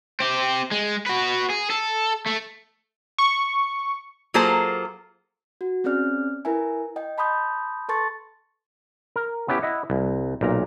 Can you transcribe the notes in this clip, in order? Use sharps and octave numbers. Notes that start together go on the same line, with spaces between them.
C4 G4
G#3
F#4 B4
G#4
A4
A3
C#6
F#3 A#3 F4 G#4 A4 C5
F#4
C4 C#4 G#4 D5 F6
E4 A#4 B4 E5 G#5
D#5 G5
A5 B5 C6 D#6 G6
A4 B4 A5 C6 C#6 A6
A#4
B3 C#4 E4 G4 B4
E4 D#5 F#5
C2
B1 A#2 A#4 A#5